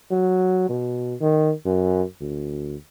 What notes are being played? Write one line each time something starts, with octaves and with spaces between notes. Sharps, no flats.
F#3
B2
D#3
F#2
D2